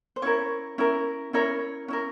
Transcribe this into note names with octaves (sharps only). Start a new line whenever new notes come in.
C5
C#4 E4 A#4 C#5
C#4 E4 A#4
C#4 E4 A#4 C#5
C#4 E4 A#4